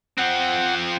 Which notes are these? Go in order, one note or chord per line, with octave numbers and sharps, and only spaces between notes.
F3 C4 F#5